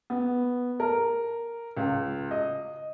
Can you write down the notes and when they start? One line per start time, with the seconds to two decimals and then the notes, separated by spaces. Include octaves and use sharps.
0.10 B3
0.80 A#4
1.77 C#2
2.31 D#5